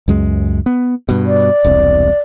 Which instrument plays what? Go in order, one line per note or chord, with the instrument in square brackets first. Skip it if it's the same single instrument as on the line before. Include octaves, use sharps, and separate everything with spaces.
[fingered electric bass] C#2 F#2 G#3
B3
G2 B2
[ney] D5
[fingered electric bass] E1 C2 C3